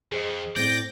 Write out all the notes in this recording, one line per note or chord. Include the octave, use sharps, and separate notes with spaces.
F2 G#4 C5 D#5
A2 C4 D5 G6 A#6